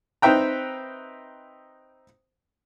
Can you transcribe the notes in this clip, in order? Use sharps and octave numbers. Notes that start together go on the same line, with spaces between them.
C4 D#4 B4 E5 G5 A#5